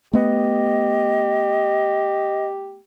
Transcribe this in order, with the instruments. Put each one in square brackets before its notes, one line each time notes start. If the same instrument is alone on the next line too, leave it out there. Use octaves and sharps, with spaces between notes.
[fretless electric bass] A3 B3 [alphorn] G4 [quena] D#5